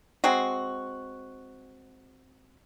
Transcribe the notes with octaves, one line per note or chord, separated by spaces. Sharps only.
G#3 C4 F#4